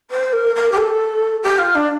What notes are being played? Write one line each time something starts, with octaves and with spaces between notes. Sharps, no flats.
C5
A#4
A#4
G4
A4
G4
F4
D4